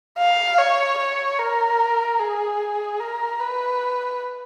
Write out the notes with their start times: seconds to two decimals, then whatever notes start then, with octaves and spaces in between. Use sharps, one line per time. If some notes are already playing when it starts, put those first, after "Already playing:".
0.18 F5
0.59 C#5
0.98 C#5
1.39 A#4
2.20 G#4
3.00 A#4
3.40 B4